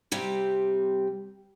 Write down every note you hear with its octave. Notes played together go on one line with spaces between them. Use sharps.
C3 G3 C4